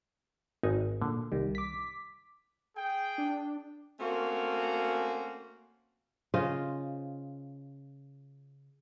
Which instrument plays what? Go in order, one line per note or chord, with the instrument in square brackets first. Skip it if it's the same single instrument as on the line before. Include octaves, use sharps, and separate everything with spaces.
[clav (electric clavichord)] G#1 D#4 G#5
[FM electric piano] A#2 [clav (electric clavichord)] D3
[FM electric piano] C2 D#3 G3
D6 B6
[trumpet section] G#4 G5
[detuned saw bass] D4
[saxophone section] A3 A#3 C4 C#4 F#4
[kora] C#3 F4 C5 D#5